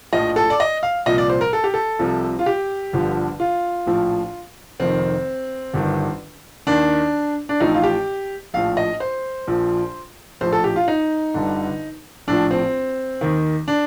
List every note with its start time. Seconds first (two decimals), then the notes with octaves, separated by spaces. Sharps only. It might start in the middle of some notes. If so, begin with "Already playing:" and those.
0.13 A#1 A2 F3 D#5
0.36 A4
0.50 D5
0.60 D#5
0.83 F5
1.06 C2 A#2 F3 D#5
1.18 D5
1.30 C5
1.41 A#4
1.53 A4
1.64 G4
1.74 A4
1.99 C2 C3 F3
2.39 F4
2.46 G4
2.93 G1 G2 D3 F3
3.40 F4
3.86 A#1 A2 F3
4.80 F1 F2 D#3 C4
5.73 G1 G2 D#3
6.67 D#2 D#3 D4
7.49 D4
7.60 A1 A2 F3 D#4
7.74 F4
7.83 G4
8.54 A#1 A2 F3 F5
8.77 D#5
9.00 C5
9.47 A#1 A#2 F3
10.41 A#1 A2 F3 C5
10.52 A4
10.64 G4
10.76 F4
10.88 D#4
11.34 G1 G2 D3
12.27 A#1 A2 F3 D4
12.51 C4
13.21 D#2 D#3
13.68 D4